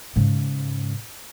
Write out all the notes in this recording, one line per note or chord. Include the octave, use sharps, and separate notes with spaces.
G#2 C#3